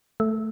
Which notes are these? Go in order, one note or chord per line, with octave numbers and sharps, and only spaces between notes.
A3